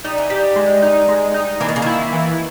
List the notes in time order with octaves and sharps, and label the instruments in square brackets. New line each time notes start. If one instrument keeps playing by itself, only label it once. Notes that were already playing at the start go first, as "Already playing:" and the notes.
[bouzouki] G3 [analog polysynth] D#4
[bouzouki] E3
[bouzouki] G3 [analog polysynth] G4
[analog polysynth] G#3
D#4
G#3
D#4
[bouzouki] E3 [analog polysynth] A#3
[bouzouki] D#3
C#3
[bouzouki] D#3 [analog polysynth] E4
[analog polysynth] E3